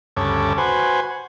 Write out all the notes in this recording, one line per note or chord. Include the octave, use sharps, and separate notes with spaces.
D2 G2 C#3 A4 C#5 D6
F#4 B4 C5 G#5